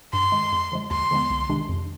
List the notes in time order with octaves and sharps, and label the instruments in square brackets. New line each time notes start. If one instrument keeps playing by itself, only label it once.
[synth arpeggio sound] G2 [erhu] C6
[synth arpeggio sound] D#3 G#3
F2
D3 F3 G#3
[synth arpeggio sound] D#2 [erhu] C6
[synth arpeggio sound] D3 F3 G#3 B3
C2
C3 D#3 G#3 D4
F2